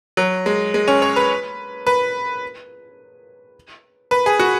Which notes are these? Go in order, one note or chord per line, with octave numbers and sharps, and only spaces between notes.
F#3
G#3
G#3
C#4
C#5
B4
B4
B4
G#4
F#4